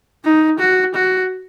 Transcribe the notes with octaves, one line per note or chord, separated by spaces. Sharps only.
D#4
F#4
F#4